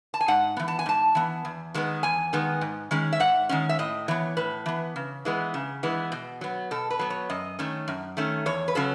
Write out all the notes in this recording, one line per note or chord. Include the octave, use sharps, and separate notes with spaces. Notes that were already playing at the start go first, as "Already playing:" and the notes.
A5
G#5
G#2 F#5
E3 B3
A5
G#5
G#2 A5
E3 B3
E2
D#3 G#3 B3
E2 G#5
D#3 G#3 B3
G#2
D#3 G#3 C#4
E5
G#2 F#5
D#3 G#3 C#4
E5
A2 D#5
E3 B3 C#5
A2 B4
E3 B3
C#3
E3 G#3 B3
C#3
E3 G#3 B3
B2
F#3 B3
B2 A4
B4
F#3 B3
C#5
F#2 D#5
D#3 A3 C#4
F#2
D#3 A3 C#4
E2 C#5
B4
C#3 F#3 C#4 A4